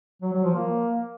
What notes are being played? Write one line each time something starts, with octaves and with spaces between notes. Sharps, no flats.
F#3
F#3
F3
A#3